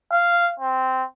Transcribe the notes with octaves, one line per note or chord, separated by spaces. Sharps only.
F5
C4